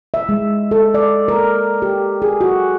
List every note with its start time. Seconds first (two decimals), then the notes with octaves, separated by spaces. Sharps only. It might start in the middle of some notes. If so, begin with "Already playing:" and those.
0.14 E5
0.29 G#3
0.71 A4
0.94 D5
1.28 A#4
1.82 G4
2.22 G#4
2.41 F#4